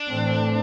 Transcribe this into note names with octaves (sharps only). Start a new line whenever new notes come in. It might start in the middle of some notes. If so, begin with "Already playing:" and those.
Already playing: D4
A2 E3 A3 C4